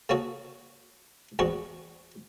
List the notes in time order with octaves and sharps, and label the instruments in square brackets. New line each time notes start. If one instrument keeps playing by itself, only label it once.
[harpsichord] C#3 A#3 C#4 F#4 G#4 A4
A1 E2 G#2 F#4 G#4 C#6